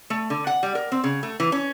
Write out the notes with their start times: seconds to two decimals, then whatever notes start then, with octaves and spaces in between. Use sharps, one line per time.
0.10 A3
0.30 D3
0.47 F#5
0.63 G3
0.75 A#4
0.92 C4
1.04 C#3
1.23 A3
1.40 E3
1.52 C#4